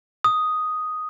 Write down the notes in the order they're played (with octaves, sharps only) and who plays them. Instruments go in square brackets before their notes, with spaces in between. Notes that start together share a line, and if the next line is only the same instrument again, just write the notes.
[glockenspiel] D#6